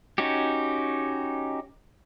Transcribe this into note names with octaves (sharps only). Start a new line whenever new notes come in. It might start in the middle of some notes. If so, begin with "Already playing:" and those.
C#4 D#4 F#4 G4